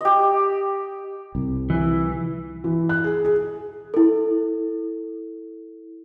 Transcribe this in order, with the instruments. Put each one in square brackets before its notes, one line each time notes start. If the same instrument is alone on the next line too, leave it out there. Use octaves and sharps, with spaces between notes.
[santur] G4 D#5
[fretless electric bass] C2
[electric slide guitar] E3
[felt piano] E3
F#6
G#4
G#4
[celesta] E4 A4